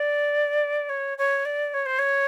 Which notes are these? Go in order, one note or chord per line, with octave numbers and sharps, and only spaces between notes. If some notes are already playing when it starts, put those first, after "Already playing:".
Already playing: D5
C#5
C#5
D5
C#5
C5
C#5